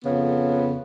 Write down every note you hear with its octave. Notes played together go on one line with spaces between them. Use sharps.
F2 C#3 B3